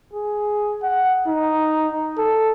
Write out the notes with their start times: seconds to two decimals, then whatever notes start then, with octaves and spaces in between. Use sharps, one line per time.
0.13 G#4
0.83 F#5
1.28 D#4
2.18 A4